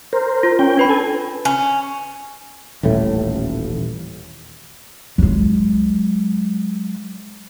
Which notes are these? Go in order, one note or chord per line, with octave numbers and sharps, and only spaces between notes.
A#4 C5
F4
C#4 G5
D4 B4 B5
A4 G#5
C#4
D#1 A1 A2 A3
F#3 G#3